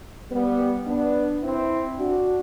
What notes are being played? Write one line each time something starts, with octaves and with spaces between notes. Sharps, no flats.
G3 B3
B3 D4
C4 E4
D4 F#4